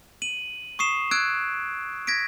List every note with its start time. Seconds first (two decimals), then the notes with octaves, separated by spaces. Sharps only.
0.22 D#7 F#7
0.79 C#6 D#6 C7 E7
1.11 E6 F#6 G#6 D7
2.07 G#6 A#6 B6 D7